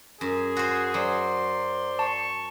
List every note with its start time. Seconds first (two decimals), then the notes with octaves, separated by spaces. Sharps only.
0.21 F#2 G#4
0.57 F#4 C5
0.94 F#3 C5 D5 C6
1.99 A5 C#6